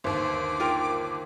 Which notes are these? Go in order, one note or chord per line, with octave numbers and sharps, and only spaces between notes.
G1 D#2 C5 D6
F4 A#4 G5